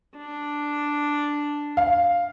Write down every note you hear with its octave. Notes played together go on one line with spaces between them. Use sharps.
D4
F5